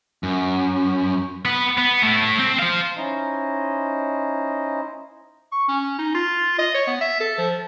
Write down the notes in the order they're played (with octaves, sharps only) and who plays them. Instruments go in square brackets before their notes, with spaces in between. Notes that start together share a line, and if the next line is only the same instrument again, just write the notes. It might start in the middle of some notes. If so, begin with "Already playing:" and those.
[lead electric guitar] F#2
[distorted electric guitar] B3 B4
B3
A3 E4
C4
C5 F5
[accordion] C#4 D#4 E4 C5 D#5
[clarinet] C#6
C#4
D#4
F4
D#5
C#5
B3
E5
A4
F3